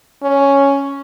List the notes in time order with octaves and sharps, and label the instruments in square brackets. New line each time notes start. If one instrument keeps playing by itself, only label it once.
[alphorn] C#4